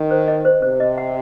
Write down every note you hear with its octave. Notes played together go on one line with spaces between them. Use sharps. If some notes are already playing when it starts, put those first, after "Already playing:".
Already playing: D#3
C5
D#5
C5
C3 C5
D#5
F#5